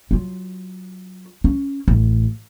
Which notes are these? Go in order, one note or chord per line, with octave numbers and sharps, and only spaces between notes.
F#3 F4
C#4
A1